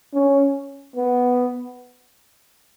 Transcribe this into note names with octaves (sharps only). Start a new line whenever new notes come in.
C#4
B3